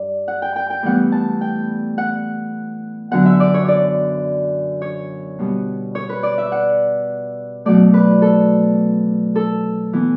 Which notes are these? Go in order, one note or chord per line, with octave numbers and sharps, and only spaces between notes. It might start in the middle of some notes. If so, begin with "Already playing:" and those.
Already playing: G2 D5
F#5
G5
G5
G5
A2 E3 G3 B3 F#5
A5
G5
F#5
F#2 D3 F#3 B3 F#5
E5
D5
C#5
D5
C#5
B2 G3 B3
C#5
B4
D5
E5
F#5
B2 F#3 A3 D5
B4
A4
A4
E3 B3